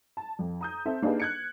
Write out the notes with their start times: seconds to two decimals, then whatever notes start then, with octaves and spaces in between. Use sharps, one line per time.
0.17 A5
0.39 F2
0.61 A#5 D#6 G6
0.85 C4 A4 E5
1.02 A#3 D4 D#4 G4 G#4 B4
1.20 F#6 G#6 C#7